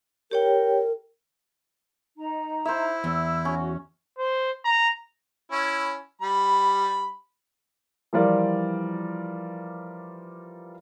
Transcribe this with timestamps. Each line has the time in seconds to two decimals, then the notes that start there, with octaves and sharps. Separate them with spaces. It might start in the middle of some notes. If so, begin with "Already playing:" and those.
0.31 G4 A#4 C#5 G5
2.17 D#4 A#5
2.65 E4 C5 E5
3.04 E2 E6
3.45 C#4 F#4
4.19 C5
4.65 A#5
5.52 C#4 E4
6.22 G3 B5
8.13 E3 F3 G3 F4 A#4 D5